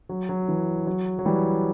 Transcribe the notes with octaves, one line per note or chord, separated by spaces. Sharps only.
F#3
F#3
E3
F#3
F#3
E3 G3